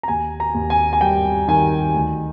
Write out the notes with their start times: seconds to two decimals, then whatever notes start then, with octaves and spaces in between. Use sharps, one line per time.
0.03 A#5
0.08 D#2 G#5
0.40 A#5
0.54 D#2
0.70 G#5
0.93 G#5
1.01 G3 G5
1.48 D#3 G#5
1.94 D2